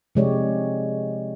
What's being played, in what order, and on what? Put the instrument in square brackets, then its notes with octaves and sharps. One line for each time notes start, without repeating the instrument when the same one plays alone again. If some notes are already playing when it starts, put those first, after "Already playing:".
[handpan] C3 F3 G#3 G4 C#5 D5